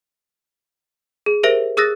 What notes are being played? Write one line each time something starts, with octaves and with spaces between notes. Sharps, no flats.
G#4
G4 A#4 C5 E5 A#6 D7
G#4 D#6 E6 F#6 A6 A#6